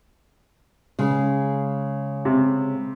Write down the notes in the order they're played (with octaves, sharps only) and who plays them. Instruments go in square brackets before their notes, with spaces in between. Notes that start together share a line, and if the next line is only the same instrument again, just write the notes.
[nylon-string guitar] C#3 G#3
[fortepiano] C3